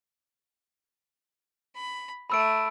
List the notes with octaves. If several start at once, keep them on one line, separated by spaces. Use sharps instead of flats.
B5
A3 B5 E6 D7